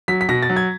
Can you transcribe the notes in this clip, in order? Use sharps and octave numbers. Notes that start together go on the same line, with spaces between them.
F#3 B6
B6
B2 A#6
A6
F#3
G#6